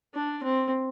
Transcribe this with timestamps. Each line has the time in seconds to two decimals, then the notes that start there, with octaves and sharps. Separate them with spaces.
0.14 D4
0.43 C4